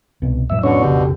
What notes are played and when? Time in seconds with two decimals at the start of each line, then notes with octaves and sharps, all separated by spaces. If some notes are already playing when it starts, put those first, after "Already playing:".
0.22 C2 B2
0.50 F1 A2 F#3 E5
0.63 B2 D3 C#4 D4 C#5
0.84 F1 B1 C#3 G4